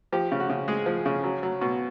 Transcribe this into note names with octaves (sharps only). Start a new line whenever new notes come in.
F3 G4
C#3
F#4
C#3
G#3 G#4
F3
C#3
F#3
F#3
B2